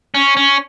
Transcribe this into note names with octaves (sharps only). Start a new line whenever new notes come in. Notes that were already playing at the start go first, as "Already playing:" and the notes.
C#4
C#4